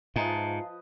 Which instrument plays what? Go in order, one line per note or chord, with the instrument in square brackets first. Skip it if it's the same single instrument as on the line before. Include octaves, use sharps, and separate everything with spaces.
[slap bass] G#2 [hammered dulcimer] F3 B4 D#5 [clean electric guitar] F4 [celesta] E5 G#5 A#5